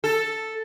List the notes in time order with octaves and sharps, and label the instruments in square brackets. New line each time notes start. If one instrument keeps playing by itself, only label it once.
[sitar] A4